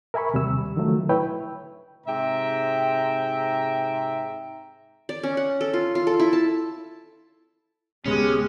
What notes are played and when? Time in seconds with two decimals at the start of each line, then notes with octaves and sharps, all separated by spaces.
0.14 A#4 E5 G#5 B5 C#6
0.34 D#2 C3 G3 E6
0.76 D3 D#3 F3 F#3 A3
1.09 E4 B4 C#5 E5 G5
2.07 G#2 C3 E5 G5 A#5
5.09 D5
5.23 C#4
5.37 F#5
5.61 A4
5.73 F4
5.95 F4
6.07 A4
6.20 E4
6.33 A5
8.06 D#1 C#3 G#3 B3 C#4 G4